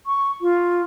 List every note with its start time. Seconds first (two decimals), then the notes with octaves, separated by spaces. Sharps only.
0.06 C#6
0.41 F4